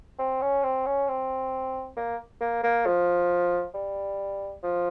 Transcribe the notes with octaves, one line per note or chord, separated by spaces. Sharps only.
C4
C#4
C4
C#4
C4
A#3
A#3
A#3
F3
G3
F3